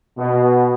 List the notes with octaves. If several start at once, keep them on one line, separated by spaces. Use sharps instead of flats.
B2